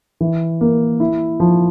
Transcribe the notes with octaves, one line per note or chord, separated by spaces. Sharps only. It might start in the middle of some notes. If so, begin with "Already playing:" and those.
E3
A#3
E4
F3